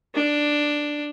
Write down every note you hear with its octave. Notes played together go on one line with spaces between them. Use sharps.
D4